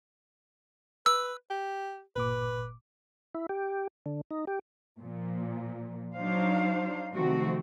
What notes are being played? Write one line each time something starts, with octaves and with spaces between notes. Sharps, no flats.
B4 E6
G4
G1 A#2 B4 D6
E4
G4
D3
D#4
G4
A#2 F3
F#3 D4 D#4 C5 F5
C3 D#3 F3 A3 C4 F#4